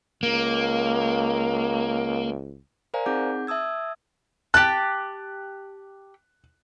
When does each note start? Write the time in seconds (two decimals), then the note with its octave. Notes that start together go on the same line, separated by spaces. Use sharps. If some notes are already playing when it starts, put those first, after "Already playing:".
0.23 C#2 A#3
2.94 A#4 C5 D5 F5 G#5 A#5
3.06 C4 D#4 G#4 F#5 D6 G6
3.47 E5 A5 D#6 E6 G#6
4.54 G4 A5 F#6